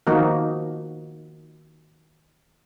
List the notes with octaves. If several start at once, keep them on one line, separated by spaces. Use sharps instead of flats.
D#3 F3 A#3 D#4 F#4